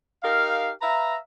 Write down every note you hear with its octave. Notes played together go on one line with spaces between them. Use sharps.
D#4 G4 A#4 F5
B4 E5 F5 A#5